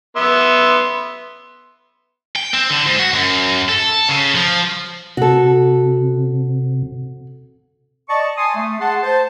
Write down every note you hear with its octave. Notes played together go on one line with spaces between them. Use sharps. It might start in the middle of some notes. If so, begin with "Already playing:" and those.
B3 E5 C6
G5
C4
D3
G#2
F#4
F#2
A4
C#3
F3
C3 F#4 A4
D5 D#5 A5 C#6
G#5 A5 C6 D#6
A3
G#4 F#5 A5 C6
C5 A5